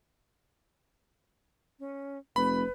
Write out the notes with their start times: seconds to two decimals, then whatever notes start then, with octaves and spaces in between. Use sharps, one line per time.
1.80 C#4
2.36 F1 B4 B5